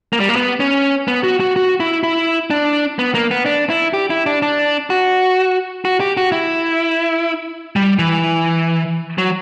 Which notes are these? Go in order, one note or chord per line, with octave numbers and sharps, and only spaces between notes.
A#3
G3
A#3
B3
C#4
B3
F#4
F#4
F#4
E4
E4
D4
B3
A#3
B3
D4
E4
G4
E4
D4
D4
F#4
F#4
G4
F#4
E4
G3
E3
F#3